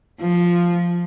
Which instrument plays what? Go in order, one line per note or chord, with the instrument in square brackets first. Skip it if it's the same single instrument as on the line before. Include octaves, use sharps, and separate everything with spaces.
[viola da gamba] F3